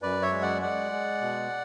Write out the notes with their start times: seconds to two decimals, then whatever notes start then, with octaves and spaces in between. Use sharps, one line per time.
0.02 F#2 B4 D5
0.22 C#5 E5
0.32 G#3
0.42 D5 F#5
0.62 G#3 D5 F#5
0.92 G#3
1.21 B2